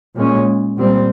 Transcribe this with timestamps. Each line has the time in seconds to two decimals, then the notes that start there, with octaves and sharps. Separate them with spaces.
0.16 A#2 G#3 C#4
0.77 A#2 G3 C4